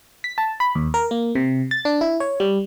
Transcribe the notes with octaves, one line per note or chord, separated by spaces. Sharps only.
B6
A5
B5
D#2
A#4
A#3
C3
A6
D4
E4
C#5
G3